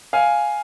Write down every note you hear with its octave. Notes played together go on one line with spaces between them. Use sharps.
F5 G#5